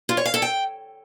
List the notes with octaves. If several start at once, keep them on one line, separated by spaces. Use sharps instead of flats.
F4
C#5
F5
A4
G5